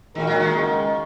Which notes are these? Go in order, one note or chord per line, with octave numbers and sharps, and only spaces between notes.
A#2 D#3 G#3 F#4 A#4
F#3
D#3
C#2 C#3 G#3 F#4 A#4